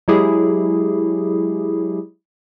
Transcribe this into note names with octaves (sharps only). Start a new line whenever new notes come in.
F#3 G#3 E4 G4 G#4